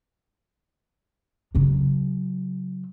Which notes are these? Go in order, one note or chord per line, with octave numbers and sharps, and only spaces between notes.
C#3 F#3